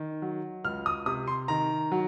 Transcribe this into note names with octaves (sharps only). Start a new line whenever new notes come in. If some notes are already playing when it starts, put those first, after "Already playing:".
Already playing: D#3
F#3
C#2 F6
D#6
C3 D#6
C6
D#3 A#5
F#3